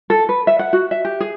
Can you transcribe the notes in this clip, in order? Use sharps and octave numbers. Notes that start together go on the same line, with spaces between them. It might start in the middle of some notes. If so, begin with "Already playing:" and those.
A4
B4
E5
F#5
F#4
E5
G4
G#4